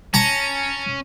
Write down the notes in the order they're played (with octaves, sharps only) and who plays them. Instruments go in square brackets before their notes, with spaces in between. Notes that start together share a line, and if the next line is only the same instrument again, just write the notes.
[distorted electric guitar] C#4 [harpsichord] A5 A#5